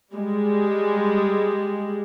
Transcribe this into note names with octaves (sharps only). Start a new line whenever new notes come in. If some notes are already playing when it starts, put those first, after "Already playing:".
G3 G#3